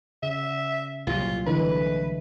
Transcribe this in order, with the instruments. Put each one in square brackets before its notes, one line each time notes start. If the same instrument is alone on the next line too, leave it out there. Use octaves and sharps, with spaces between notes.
[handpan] C#3 [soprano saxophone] E5
[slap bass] C2 A#2 F#3 [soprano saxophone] F4
[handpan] D3 E3 G#3 [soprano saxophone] B4